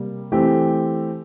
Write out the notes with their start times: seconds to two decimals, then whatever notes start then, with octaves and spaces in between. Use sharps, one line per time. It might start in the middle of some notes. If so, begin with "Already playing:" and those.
Already playing: C3 G3 A#3
0.32 E3 A3 C4 G4